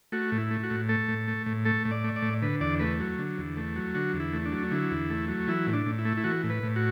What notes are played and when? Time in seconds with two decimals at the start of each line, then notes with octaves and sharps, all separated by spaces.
0.12 A3 F#4
0.32 A2
0.38 E4
0.51 A3
0.63 F#4
0.70 A2
0.89 A3 A4
1.08 A2
1.28 A3
1.46 A2
1.65 A3 A4
1.85 A2
1.91 D5
2.04 A3
2.16 D5
2.22 A2
2.42 D3 B4
2.61 E2 D5
2.80 A3 B4
3.00 F#3
3.19 D3
3.38 E2
3.57 A3
3.76 F#3
3.95 D3 F#4
4.13 E2
4.20 E4
4.33 A3
4.45 D4
4.52 F#3
4.71 D3 E4
4.91 E2
5.10 A3
5.28 F#3
5.48 E3 E4
5.67 A2
5.73 D4
5.86 A2
5.99 E4
6.05 A3
6.17 E4
6.24 E3 F#4
6.44 A2
6.50 B4
6.63 A2
6.76 F#4